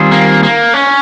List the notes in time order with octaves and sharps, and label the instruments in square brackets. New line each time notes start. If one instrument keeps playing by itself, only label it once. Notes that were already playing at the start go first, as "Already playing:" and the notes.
Already playing: [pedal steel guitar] D#3 G3 C4 F4 G#4
[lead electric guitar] A#3
A#3
C#4